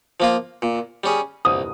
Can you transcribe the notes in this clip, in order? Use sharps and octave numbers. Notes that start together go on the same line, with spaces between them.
F3 A#3 F4
A#2
G3 C#4 G#4
C2 D#6